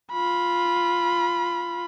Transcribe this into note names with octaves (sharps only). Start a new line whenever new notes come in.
F4 B5